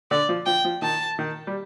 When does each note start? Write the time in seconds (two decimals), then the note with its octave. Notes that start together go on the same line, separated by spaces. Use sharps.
0.11 D3 D5
0.29 F3
0.46 F3 G5
0.65 F3
0.82 D#3 A5
1.19 D#3
1.47 G3